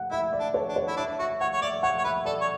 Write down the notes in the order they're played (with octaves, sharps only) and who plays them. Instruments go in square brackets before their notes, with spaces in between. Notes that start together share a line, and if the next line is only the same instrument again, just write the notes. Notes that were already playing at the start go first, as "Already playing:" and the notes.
Already playing: [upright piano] F#5
[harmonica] E4 [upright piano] E5
[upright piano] D5
[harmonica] D4
[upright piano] C#5
[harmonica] D4
[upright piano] C#5
[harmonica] E4
[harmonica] D4 [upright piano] E5
[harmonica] F#4 [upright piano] E5
[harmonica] C#5 [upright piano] F#5
[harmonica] C#5
[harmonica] D5 [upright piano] E5
[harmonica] C#5 [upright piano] F#5
[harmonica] C#5
[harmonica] B4 [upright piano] E5
[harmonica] A4 [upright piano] D5
[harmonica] C#5